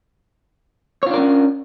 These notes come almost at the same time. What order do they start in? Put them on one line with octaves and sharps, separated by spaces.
C#5 F4 D4 A#4 C#4